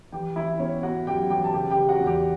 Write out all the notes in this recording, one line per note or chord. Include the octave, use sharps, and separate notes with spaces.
E3 G4 G5
E3 E4 E5
B3 C#4 C#5
B3 F#4 F#5
F#2 G4 G5
E3 G4 G5
A5
C#3 G4 G5
G4 G5
C#3
F#4 F#5
E2
G4 G5